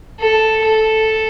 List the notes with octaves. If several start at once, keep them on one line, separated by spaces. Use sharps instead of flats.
A4
A4